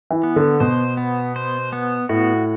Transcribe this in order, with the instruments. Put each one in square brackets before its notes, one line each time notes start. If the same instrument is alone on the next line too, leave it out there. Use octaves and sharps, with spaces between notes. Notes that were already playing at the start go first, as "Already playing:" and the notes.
[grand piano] E3
[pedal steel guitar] B3
[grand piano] D3
[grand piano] B2 [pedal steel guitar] C5
[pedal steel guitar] B3
C5
B3
[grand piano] A2 [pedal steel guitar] F#4